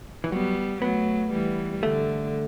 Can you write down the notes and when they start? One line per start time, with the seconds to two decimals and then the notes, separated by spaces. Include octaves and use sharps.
0.24 E3
0.31 F#3 G3 B3
0.82 F#3 A3 B3
1.32 E3 G3
1.83 D3 A3